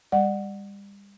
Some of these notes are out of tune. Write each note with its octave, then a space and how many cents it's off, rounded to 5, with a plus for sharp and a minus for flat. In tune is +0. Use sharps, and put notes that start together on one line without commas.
G3 +35 D5 +25 F#5 +0